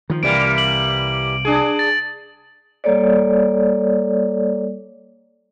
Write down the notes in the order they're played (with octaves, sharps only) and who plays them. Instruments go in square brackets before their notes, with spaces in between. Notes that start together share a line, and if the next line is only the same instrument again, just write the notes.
[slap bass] D#3 F3
[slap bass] C2 [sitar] E3 G3 A#3 [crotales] D7
[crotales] F#7
[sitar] D4 G#4
[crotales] A6
[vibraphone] G3 A#3 A4 C#5 D5